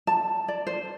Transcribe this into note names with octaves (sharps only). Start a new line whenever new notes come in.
A5
D5
C5